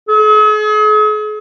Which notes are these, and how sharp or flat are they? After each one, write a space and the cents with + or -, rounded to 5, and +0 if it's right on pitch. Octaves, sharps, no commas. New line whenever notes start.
G#4 +45